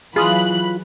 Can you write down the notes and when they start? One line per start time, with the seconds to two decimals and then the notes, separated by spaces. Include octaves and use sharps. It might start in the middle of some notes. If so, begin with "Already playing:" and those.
0.16 E3 F#3 F4 G#4 B5 D#6 F#6